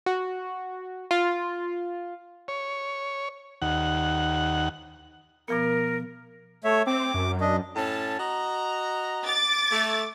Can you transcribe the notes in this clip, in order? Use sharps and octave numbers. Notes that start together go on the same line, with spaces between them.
F#4
F4
C#5
D#2 F#5
B2 F3 B3 A#4
A3 C#5 E5
C4 D6
F#2
D4 D#5
A2 C#4 A5
F#4 D#5 A#5
D6 A6
A3